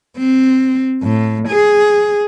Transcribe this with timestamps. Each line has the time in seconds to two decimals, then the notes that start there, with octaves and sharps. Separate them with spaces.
0.17 C4
1.03 A2
1.48 G#4